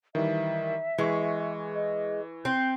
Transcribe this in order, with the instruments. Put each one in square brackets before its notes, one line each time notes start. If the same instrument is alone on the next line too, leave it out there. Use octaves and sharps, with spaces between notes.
[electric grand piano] D#3 E3 G3 [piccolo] E5
[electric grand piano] E3 C#6 [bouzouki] G#3
[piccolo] D#5
[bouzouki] C4 [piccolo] G6